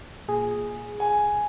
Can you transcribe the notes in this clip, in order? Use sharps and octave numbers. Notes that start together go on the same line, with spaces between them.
A#2 G#4
G#5